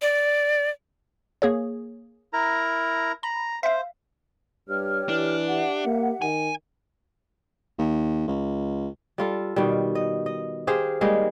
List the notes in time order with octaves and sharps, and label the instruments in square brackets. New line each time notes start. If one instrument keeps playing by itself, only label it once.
[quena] D5
[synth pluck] A#3 G#4 C#5
[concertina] E4 A#4 A#5
[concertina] A#5 [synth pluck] B5
[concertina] C5 [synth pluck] E5 F5
[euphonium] G2 [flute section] G4 C#5 F6
[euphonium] E3 [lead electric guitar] D4
[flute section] G4 E5 F#5
[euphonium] A#3
[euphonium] D#3 [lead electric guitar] G#5
[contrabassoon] D#2
C#2
[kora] G3 F4 A4
B2 D#3 G3
D#5
D#5
G4 G#4 C5 F5
G3 G#3 A#3 D#4